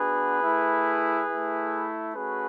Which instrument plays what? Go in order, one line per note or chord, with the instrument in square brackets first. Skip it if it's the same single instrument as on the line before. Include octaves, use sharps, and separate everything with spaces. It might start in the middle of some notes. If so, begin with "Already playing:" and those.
Already playing: [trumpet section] B3 D4 F#4 G#4 B4
A3 E4
A3 E4
A3 C#4 F#4 G#4 B4